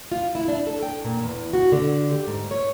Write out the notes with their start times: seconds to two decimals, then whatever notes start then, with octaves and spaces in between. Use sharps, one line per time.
0.12 F4
0.35 E4
0.48 D4
0.67 A4
0.83 G5
1.04 A#2
1.23 E2
1.53 F#4
1.72 D3
2.11 G4
2.27 G#2
2.51 C#5